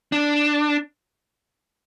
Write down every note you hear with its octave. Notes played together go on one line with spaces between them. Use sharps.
D4